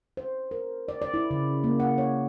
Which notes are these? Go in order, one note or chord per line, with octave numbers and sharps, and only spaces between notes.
C5
A#4
D5
D5
E4
C#3
A#3
F#5
C#5